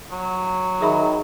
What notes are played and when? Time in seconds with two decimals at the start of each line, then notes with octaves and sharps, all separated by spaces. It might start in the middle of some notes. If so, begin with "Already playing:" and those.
0.12 F#3
0.81 D#3 G#4 E5 B5